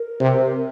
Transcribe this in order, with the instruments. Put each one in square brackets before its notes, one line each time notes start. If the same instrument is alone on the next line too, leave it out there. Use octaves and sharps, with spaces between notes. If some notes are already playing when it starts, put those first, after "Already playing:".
Already playing: [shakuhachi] A#4
[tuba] C3